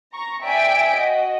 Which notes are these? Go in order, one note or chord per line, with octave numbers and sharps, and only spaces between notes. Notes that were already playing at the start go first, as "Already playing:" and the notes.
A#5 C#6
D5 E5 G5 G#5 B6 D7
F#4 D#5